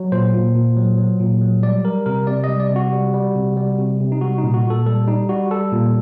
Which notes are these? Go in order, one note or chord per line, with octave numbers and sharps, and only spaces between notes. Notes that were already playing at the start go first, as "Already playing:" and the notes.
Already playing: F#3
A#2 C5
A#2
A#2
F#3
F#3
A#2
F#3
G3 D5
G3 A#4
C3 A#4
C3 D5
D#5
G3
D5
C3
F#4
G3
G3
C3
G3
C3
C3
D#4
G3 F#4
A#2 D#4
F#4
A#2
A4
G3 A4
G3 D#4
G3 F#4
G3 A4
A#2